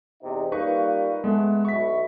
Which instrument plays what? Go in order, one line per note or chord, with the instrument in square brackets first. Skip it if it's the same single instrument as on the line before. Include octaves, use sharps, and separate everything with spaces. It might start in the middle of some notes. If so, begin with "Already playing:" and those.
[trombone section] E2 C3 D#4
[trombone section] G3 A#3 F4 [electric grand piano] D#4 B4 C#6
[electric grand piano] G#3 B3 [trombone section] A3
[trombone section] B1 B3 E4 [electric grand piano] C#6 B6